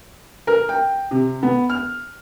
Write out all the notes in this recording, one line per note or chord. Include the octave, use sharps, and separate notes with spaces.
A#4
G5
C3
B3
F6